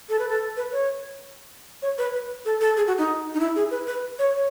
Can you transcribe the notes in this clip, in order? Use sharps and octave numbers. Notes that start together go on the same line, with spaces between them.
A4
B4
A4
B4
C#5
C#5
B4
B4
A4
A4
G#4
F#4
D#4
D#4
E4
G#4
B4
B4
C#5
C#5